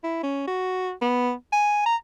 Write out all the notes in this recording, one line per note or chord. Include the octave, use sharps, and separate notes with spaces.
E4
C#4
F#4
B3
G#5
A#5